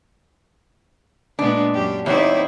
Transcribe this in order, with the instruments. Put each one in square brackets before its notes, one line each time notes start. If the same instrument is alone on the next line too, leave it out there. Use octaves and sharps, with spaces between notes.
[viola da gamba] A#2 G#3 B3 [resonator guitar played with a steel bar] D4
[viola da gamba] F#2 G4
[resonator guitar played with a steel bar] E2 G3 [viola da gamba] C4 D#4 E4 [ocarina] C#5